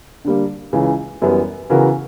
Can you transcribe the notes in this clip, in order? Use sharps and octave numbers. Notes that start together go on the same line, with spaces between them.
D3 G3 A#3
C#2 C#3 E3
F#2 E3 G3 B3
C#3 E3 B3 F#4 A#4